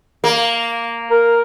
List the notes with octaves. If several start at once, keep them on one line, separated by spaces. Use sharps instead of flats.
A#3
A#4